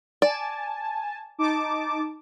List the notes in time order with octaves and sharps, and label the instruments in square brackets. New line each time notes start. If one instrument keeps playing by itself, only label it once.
[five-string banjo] D5 [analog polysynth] G#5 A5
[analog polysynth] D#4 A5 D6